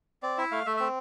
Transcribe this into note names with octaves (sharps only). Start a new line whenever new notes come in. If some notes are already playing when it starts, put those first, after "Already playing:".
C4 D5
E4 E5
A3 F5
A3 E5
C4 E5